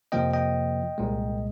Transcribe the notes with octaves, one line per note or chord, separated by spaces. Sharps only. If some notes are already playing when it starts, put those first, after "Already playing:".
F2 C3 F3 A#3 D#5 G5
D#5 G5
C2 A#2 G#3